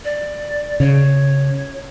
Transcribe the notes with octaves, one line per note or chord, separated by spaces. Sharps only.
D5
C#3 C#5